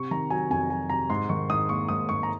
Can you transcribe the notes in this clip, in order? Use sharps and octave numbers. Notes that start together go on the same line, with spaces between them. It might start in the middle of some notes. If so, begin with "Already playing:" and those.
Already playing: C3 C#6
D#3 A#5
F#3 G#5
F2 G#5
F#3 G#5
C3 A#5
G#2 C6
D#3 C#6
G#2 D#6
A#3 C#6
G#2 D#6
G#2 C#6
A#5